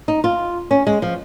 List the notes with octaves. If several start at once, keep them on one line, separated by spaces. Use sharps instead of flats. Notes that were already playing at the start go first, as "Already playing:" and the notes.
D#4
F4
C#4
G#3
F3